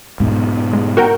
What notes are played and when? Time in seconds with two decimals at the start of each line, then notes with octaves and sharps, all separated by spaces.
0.20 G#2 B2
0.73 G#3
0.97 F#4 A#4 G5